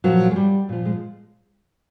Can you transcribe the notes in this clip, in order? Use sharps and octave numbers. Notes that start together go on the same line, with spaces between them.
A#2 F3 F#3
G#3
G3
A#2 F3
G#3